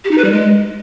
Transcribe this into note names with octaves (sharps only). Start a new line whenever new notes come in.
G4
D#4
B4
G3
G#3